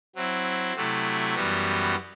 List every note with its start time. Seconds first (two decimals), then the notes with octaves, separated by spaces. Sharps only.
0.15 F#3 C4 E4
0.75 C3 F#3 A3 E4
1.35 F#2 E3 G3 B3 F#4